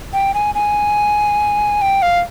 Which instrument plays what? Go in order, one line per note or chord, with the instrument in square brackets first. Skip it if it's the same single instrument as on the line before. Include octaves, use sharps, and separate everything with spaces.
[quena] G5
G#5
G#5
G5
F5